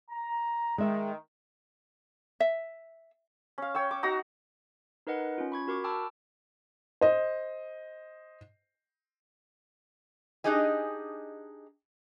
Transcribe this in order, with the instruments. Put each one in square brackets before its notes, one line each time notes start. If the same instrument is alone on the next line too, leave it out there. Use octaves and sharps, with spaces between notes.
[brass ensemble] A#5
[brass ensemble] D#3 [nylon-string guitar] G#3 E5
[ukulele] E5
[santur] C#4 F5
C#5 G5 E6
D6
D#4 F#4 A#5
[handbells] D#4 A#4 B4 D#5 F#5
C#4 F4
B5 C#6 G#6
F#4 A#4 C#6 D6
G5 A5 B5 D6 E6 F6
[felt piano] C5 D#5
[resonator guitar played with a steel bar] D4 D#4 G4 G#4 D#5 G#5